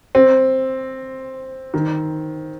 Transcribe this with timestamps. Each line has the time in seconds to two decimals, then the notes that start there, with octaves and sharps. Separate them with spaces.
0.15 C4
1.74 D#3